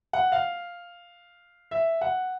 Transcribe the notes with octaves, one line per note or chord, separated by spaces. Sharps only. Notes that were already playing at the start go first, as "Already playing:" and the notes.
F#5
F5
E5
F#5